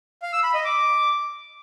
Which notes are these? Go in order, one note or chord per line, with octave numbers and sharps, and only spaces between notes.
F5
E6
B5
D#5
D6